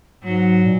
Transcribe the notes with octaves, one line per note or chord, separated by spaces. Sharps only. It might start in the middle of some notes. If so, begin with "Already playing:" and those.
G#2 F#3
A#2